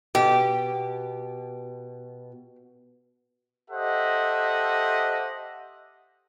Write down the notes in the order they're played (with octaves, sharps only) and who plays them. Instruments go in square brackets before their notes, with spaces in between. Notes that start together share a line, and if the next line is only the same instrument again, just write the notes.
[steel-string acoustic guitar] B2 [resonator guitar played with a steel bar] G4
[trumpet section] G4 A4 C5 D#5 E5 F#5